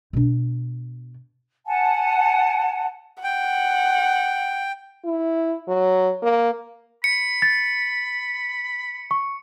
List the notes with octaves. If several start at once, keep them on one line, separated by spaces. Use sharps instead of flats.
B2 D4
F#5 G#5 A5
F#5 G5
E4
F#3
A#3
B5 C#7
A6
C#6